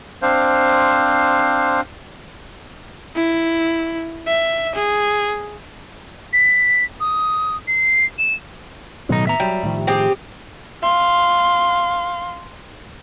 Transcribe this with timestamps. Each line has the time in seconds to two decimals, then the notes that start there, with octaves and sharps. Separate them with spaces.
0.22 C4 D4 C5 F5
3.16 E4
4.27 E5
4.75 G#4
6.33 B6
7.00 D#6
7.68 C7
8.18 E7
9.09 B1 A2 D#3 B3 D#4
9.27 E5 A#5
9.40 F#3 G3
9.63 A2 D#3 F3
9.87 C4 G4 G#4
10.83 F5 C6